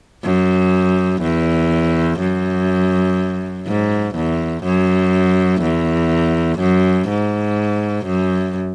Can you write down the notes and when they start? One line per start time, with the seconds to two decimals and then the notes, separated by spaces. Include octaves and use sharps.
0.25 F#2
1.23 E2
2.20 F#2
3.67 G#2
4.16 E2
4.64 F#2
5.62 E2
6.60 F#2
7.08 G#2
8.06 F#2